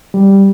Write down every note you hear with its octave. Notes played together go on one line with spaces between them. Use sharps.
G3